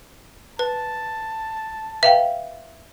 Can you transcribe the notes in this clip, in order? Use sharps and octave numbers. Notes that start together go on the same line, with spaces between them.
B4 A5
B4 E5 F5 G5